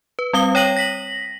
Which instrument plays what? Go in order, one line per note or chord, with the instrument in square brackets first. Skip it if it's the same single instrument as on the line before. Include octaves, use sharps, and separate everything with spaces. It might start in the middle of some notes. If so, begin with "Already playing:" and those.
[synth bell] B4
G3 C4 F5 D#6 G7
C#5 G5 A#6 D#7 F#7
A#6 B6 F#7